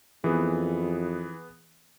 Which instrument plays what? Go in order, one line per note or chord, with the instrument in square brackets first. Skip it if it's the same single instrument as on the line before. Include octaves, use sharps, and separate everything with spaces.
[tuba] F2 [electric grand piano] E3 [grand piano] B3 G#4